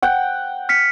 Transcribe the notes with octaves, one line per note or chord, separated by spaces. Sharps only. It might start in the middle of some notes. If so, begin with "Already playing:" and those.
F#5 G5
F6 B6 C#7